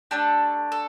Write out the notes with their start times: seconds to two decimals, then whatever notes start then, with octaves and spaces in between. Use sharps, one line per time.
0.11 A3 D4 G4 A4
0.72 A4